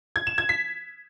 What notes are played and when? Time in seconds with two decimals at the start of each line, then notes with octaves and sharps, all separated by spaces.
0.16 G#6
0.27 E7
0.38 G#6
0.49 B6